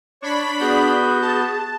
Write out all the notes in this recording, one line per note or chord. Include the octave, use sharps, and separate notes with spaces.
D4 C#5 B5 C#6 B6
B3 F#4 G#4 G6
A5